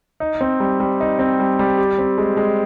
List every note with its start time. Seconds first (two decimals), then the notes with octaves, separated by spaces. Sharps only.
0.20 D#4
0.41 C4
0.60 G3
0.80 G3
1.00 D#4
1.19 C4
1.40 G3
1.59 G3
1.78 G4
1.99 C4
2.18 G#3
2.37 G#3